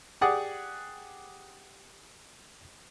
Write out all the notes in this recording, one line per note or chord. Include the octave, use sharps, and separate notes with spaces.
G4 G#4 D5 F#5 D#6 F#6